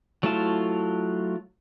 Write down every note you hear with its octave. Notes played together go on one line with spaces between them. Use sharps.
F#3 A3 E4 F4 A5